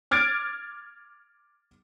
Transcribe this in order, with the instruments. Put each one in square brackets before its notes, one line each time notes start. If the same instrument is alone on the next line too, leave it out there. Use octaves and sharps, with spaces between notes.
[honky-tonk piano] D6 F6 G#6 A6 D7